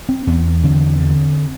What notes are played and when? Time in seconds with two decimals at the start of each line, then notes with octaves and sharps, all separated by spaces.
0.09 C4
0.27 E2 B3
0.64 D3 C4
1.00 D3